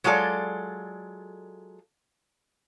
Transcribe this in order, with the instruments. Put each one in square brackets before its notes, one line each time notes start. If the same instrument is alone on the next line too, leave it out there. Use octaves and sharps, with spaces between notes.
[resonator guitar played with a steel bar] F#3 G#3 F4 A4 D5